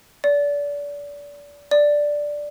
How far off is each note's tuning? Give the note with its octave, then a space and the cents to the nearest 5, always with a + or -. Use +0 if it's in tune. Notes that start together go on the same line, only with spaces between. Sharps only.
D5 -30
D5 +0